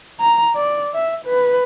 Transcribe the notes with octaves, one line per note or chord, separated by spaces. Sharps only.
A#5
D5
E5
B4